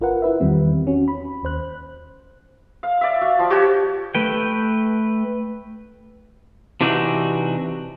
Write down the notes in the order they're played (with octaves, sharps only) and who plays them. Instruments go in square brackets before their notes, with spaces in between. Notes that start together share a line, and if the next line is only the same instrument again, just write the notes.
[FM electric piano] G1 F4 A#4 B4 F#5
E4 B4 E5
E2 D#3 G3 C4
C#4 F#4
B5
D#2 C5 F#6
[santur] F5
D5 E5
F#4 F5
F3
[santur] F#4 C#5 A5 [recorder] G4
[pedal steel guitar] A3 B4 G5
[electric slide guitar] C3 E3 D4 D#4 F#4